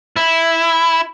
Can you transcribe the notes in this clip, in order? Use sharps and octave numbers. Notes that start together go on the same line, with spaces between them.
E4